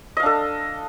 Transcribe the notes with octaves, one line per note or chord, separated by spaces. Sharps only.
D4 A4 D#5 F5